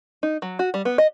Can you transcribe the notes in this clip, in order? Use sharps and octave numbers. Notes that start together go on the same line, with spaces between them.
D#4
F#3
F#4
G3
B3
D#5